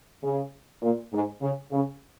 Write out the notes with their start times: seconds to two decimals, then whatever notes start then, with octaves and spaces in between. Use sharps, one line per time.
0.22 C#3
0.82 A#2
1.12 G#2
1.41 C#3
1.71 C#3